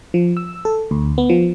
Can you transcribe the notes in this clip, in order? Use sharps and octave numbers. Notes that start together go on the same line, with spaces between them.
F3
E6
A4
D2
B3
F3